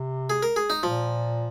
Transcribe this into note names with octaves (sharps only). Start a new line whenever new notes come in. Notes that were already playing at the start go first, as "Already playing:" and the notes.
Already playing: C3
G#4
A#4
G#4
D#4
A#2 F3